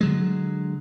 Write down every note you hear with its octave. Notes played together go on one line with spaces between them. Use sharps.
D3 F#3 G#3